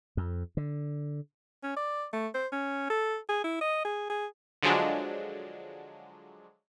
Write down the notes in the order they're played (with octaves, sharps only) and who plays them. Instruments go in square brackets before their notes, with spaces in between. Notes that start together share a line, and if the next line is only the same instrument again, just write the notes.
[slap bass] F2
D3
[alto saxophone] C#4
D5
A3
C5
C#4
A4
G#4
E4
D#5
G#4
G#4
[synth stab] D3 F3 F#3 G#3 D4